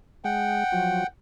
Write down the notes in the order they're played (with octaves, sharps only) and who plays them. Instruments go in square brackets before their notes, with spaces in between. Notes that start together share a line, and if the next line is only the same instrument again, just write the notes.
[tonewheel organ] G#3 [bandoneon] F#5 G5
[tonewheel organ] F3 F#3